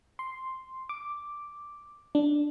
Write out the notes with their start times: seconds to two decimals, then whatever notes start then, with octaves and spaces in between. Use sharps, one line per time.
0.19 C6
0.89 D6
2.15 D4